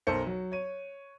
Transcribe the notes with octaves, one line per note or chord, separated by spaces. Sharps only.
B1 A4 A#4 C5 C#7
F#3
C#5 D#7